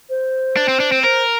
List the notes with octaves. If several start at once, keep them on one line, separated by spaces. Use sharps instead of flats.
C5
D4
C4
D4
C4
A#4 C5